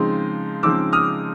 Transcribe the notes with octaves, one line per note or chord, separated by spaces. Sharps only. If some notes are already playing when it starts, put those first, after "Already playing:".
Already playing: C#3 F3 G#3 C4 D#4
C#3 F3 G#3 C4 D#4 D6 E6
D#6 F6